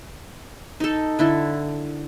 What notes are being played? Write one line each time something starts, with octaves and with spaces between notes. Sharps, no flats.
D#4 A4
D3 E4 A4